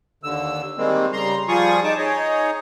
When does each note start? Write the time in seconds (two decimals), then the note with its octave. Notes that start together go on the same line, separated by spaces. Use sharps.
0.24 D#2 D3 E6
0.78 D#3 G3 G#3 A#3 C4
1.13 C#3 G3 A#5 C6
1.48 F3 G3 F4 G#4 C#6 D#6
1.84 D#4 A5 D6
1.97 D#4 G#4 C#5 D#5